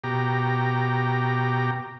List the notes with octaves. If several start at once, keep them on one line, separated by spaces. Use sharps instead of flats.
B2 G4 A#5